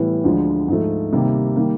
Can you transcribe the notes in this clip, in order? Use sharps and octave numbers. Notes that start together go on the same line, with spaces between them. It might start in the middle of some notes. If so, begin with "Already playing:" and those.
Already playing: A2 E3 G3 B3 E4
D2 D3 F3 G#3
G#2 F3 A3
C3 D#3 G3 A#3
D#3 G3 A#3